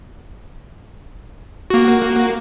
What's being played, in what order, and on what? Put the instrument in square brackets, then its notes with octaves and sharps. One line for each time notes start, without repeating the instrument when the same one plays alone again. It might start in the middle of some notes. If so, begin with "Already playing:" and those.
[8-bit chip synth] A#3 F#4